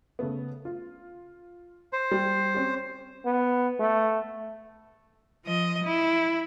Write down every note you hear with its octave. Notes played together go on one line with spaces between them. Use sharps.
C#3 A3 B3
F4
C5
G3
C4 C#4 G4
B3
A3
F3 D#5
E4